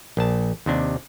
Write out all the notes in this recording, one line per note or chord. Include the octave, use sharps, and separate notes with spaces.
A#1 A5
D#2 C3 D4